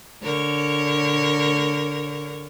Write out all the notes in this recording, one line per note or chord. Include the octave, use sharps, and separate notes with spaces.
D3 A#4 C#5